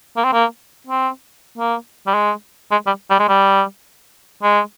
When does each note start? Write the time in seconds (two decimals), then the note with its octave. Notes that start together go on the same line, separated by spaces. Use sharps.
0.17 A#3
0.24 C4
0.33 A#3
0.87 C4
1.58 A#3
2.07 G3
2.14 G#3
2.72 G#3
2.87 G3
3.10 G3
3.19 G#3
3.29 G3
4.43 G#3